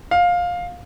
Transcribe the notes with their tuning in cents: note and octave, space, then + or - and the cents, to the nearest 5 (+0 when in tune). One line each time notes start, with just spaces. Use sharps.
F5 +15